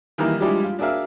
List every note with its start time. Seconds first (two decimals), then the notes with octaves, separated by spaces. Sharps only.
0.18 D#3 E3 G3 A#3 D#4 E4
0.40 F3 G3 G#3 D4 E4 G4
0.63 F4
0.79 D4 F#4 G#4 A#4 E5 F5